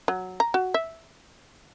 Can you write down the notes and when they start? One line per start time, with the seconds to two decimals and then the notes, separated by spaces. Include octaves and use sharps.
0.08 F#3
0.40 A#5
0.54 F#4
0.74 E5